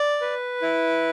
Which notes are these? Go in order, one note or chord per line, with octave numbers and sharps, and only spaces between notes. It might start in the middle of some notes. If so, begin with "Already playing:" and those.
Already playing: D5
B4
E4